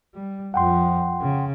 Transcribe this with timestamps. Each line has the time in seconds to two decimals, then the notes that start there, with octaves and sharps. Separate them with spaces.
0.15 G3
0.54 F2 F3 F#5 G5 C6
1.21 C#3